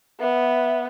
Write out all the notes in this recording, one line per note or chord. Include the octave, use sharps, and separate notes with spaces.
B3 E5